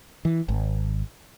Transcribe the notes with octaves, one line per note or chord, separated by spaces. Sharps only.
E3
G#1